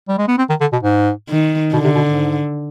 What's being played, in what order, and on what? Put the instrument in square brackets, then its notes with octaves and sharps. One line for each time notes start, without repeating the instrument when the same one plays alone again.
[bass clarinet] G3
G#3
B3
C4
D#3
D3
B2
G#2
[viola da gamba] D#3
[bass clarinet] B2 [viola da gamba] D3
[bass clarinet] C3
B2
G#2